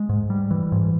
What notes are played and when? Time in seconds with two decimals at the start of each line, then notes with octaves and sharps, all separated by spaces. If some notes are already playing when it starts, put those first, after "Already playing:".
Already playing: G#3
0.09 G#2
0.30 G3
0.51 E3
0.72 G#2